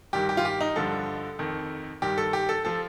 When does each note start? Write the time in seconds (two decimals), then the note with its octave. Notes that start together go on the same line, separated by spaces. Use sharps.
0.13 G2 D#3 G4
0.29 G4
0.37 F4
0.45 G4
0.61 D#4
0.76 G2 D3 F3 A4
1.39 F2 D#3
2.02 G2 D#3 G4
2.18 A4
2.33 G4
2.49 A4
2.65 F3 A4